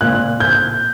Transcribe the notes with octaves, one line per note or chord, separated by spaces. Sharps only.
A#2 F#6
G6